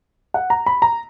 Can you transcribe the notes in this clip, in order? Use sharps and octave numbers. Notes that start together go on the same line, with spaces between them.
F#5
A#5
B5
A#5